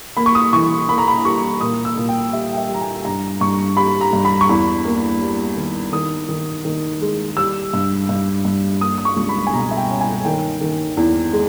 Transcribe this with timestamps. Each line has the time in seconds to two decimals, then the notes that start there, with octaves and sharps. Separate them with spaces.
0.17 A#3 B5
0.26 C#6
0.35 D#6
0.53 E3 C#6
0.89 A#3 B5
0.98 A#5
1.08 B5
1.25 G3 C#6
1.61 A#2 D#6
1.85 E6
1.97 A#2
2.09 G5
2.33 G3 E5
2.53 G5
2.57 E5
2.69 G3
2.74 A#5
2.81 G#5
3.05 G2 A#5
3.41 G2 C#6
3.77 G3 B5
4.01 A#5
4.13 G2
4.25 B5
4.41 C#6
4.49 E2 B5
4.85 A#3
5.21 G3
5.57 D#3
5.92 D#3 D#6
6.29 D#3
6.65 D#3
7.02 G#3
7.37 G3 E6
7.73 G2
8.09 G2
8.45 G2
8.81 A#3 D#6
8.98 D#6
9.05 C#6
9.17 C#2
9.29 B5
9.47 G#5
9.53 B2 A#5
9.71 E5
9.77 G5
9.89 C#4
10.01 G#5
10.25 D#3 G5
10.61 D#3
10.97 E2
11.33 G#3